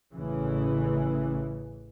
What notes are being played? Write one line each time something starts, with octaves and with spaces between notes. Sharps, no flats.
A1 C#3 E3